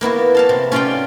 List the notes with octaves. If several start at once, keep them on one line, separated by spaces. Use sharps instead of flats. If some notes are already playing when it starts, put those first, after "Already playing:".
A#3 B3 E4 F#4
A4 F5 A5
C3
C#4 F4 C#5 D5 F5 G5